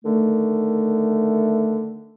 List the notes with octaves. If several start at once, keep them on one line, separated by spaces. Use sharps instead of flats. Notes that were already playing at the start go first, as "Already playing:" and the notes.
D3 D#3 A3